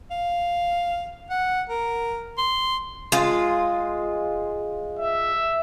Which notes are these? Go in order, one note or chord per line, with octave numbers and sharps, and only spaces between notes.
F5
F#5
A#4
C6
G#3 F4
E5